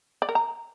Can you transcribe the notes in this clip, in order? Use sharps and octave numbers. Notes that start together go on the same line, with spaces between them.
D5
A#4
A#5